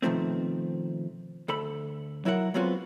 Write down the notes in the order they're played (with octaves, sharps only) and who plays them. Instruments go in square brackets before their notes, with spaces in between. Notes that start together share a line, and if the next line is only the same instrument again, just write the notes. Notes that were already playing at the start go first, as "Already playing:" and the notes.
[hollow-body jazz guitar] B2 D#3 F3 A3 C4
D2 A4 B5
F#3 E4 F#4 A#4 F#5
F#3 G#3 B3 C4 F4 F#4